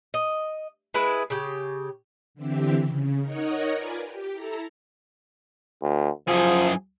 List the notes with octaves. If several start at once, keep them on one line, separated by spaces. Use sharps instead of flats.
D#5
G#3 E4 B4
C#3 G4
D3 E3 C4 E4 G4
C#3
D#4 A#4 C#5 D#5 F#5
F4 A#4 B4 D5 G#5
G4
E4 A4 A#5
D2
F#2 F3 G#4